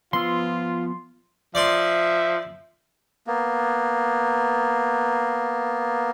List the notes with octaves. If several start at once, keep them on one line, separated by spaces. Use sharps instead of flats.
F3 B3 F4 C6 E6
F3 D5 E5 C6
A#3 B3